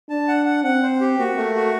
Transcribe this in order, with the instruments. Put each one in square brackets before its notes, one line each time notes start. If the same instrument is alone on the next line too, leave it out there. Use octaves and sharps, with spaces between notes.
[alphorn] D4 [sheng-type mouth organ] A5
[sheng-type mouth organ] F#5
F#5
[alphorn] C4 [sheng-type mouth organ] F#5
[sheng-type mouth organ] C5
G4
[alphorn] A#3 [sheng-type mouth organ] F#4
[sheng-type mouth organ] A3
F#4